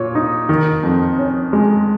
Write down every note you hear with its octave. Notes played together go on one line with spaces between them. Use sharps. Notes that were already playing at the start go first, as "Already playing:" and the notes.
Already playing: A#2 C#5
D#4
D#3
F2
C#4
G#3